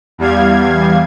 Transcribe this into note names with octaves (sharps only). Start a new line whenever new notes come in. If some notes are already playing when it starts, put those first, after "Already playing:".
E2 G3 F5 G#6